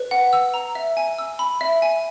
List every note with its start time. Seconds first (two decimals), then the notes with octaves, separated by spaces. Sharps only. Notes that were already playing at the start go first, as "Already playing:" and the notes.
Already playing: B4
0.11 F#5
0.33 E6
0.54 A#5
0.75 E5
0.97 G#5
1.18 E6
1.39 B5
1.61 E5
1.82 G#5